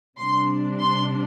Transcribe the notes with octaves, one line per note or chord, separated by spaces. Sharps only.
C3 G3 D4 C6
C6